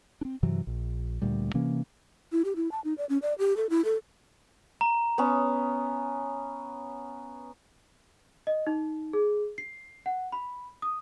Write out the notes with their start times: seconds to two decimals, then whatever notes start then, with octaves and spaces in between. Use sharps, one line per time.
0.21 C4 D4
0.43 G2 C3 E3 F#3
0.67 A#1
1.22 D2 A#2 G3
1.54 C3 E3 A#3 C#4
2.32 E4
2.45 G4
2.56 E4
2.72 A5
2.84 D#4
2.98 D5
3.09 C#4
3.22 D5
3.39 G4
3.57 A4
3.70 E4
3.85 A4
4.81 A#5
5.18 B3 C#4
8.47 D#5
8.67 D#4
9.13 G#4
9.58 C7
10.06 F#5
10.32 B5
10.82 D#6